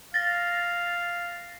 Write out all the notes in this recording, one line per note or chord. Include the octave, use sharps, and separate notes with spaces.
F5 A6 A#6